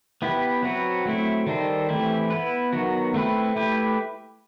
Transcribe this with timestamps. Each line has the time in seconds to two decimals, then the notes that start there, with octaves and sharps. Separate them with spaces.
0.22 B3 E4 G4 B4
0.63 F#3 C4 F#4 B4
1.05 F#3 A3 C4 E4
1.47 D#3 G3 D#4 A4 C5
1.89 E3 A3 C4 E4 G4
2.30 B3 E4 B4
2.73 D#3 F#3 B3 F#4
3.14 A3 C4 E4 B4
3.56 A3 E4 G4 B4